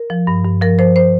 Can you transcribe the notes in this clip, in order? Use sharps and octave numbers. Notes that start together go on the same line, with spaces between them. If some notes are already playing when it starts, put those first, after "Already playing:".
Already playing: A#4
F3
G2
G2
F3 A#4
F3 C5
C5